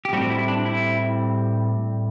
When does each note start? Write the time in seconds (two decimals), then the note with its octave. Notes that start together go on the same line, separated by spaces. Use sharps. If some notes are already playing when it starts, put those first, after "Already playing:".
0.05 G4
0.13 A2 G3 C4 F#4
0.30 E4
0.48 D4
0.65 E4